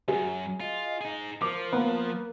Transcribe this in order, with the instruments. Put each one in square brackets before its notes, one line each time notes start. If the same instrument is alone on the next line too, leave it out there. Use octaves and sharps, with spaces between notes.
[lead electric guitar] C#2 F#2 [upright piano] F#4 G#4
[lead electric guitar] F4 [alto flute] D#5
[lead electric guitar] D#4 G#4
[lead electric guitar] F3 [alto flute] A#4 [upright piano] D6
[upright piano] A#3 B3